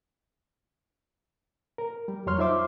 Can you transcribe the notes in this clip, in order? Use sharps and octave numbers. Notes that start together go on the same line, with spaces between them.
A#4
G3
F2 F#3 C#5 C6 F6
D#4 F4 C5 E5 C6 D6